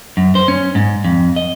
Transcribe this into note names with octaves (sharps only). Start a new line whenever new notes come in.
F#2
C5
C#4
G#2
F2
D#5